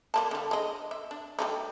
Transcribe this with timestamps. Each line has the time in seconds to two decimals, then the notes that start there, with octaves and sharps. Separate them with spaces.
0.14 G3 A#3 A5
0.31 D3 G3
0.51 G#3 D#5
0.91 E5
1.11 D4
1.39 G3 A3 D#4